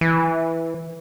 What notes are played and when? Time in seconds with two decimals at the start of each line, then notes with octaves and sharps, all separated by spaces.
0.01 E3